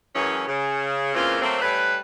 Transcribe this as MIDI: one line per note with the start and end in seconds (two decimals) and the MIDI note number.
0.15 0.43 42
0.15 0.43 45
0.15 0.43 52
0.15 0.43 54
0.15 0.43 61
0.15 0.43 68
0.48 1.13 49
1.15 1.37 46
1.15 1.37 49
1.15 1.37 52
1.15 1.37 58
1.15 1.37 60
1.15 1.37 65
1.42 1.58 54
1.42 1.58 57
1.42 1.58 58
1.42 1.58 60
1.62 1.97 55
1.62 1.97 57
1.62 1.97 61
1.62 1.97 71